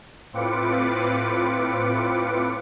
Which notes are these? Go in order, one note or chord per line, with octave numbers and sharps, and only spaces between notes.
A2 C4 F4 B4 D6 C#7